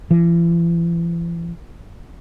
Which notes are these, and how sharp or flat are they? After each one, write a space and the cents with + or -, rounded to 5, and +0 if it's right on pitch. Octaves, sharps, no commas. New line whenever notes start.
E3 +45